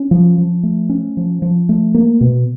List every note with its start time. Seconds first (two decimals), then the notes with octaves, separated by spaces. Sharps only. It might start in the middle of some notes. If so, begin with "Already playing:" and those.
Already playing: C#4
0.11 F3
0.38 F3
0.63 A3
0.89 C#4
1.17 F3
1.42 F3
1.69 A3
1.94 A#3
2.21 B2